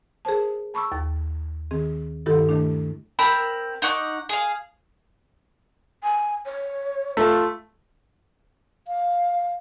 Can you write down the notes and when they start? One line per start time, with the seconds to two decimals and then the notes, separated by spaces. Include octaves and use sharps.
0.25 G#4 A#4 C5 A5
0.74 A5 B5 C#6 D6 E6
0.92 D#2 A6
1.71 D#3 C4 G#4
2.26 G2 D#3 E4 G4 A4
2.49 D#3 A3 D4
3.19 C4 A#4 B5 E6
3.82 D#4 F#5 C#6 D6
4.29 G#4 F5
6.03 G#5
6.45 C#5
7.17 A3 F4
8.88 F5